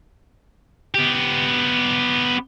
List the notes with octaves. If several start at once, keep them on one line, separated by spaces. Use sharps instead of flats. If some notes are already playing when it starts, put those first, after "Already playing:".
B3 G4